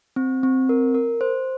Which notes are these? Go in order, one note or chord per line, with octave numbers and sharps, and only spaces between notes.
C4
C4
A#4
A#4
C5